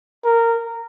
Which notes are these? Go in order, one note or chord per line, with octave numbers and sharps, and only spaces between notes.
A#4